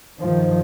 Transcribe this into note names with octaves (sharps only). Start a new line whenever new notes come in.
G2 D#3 F3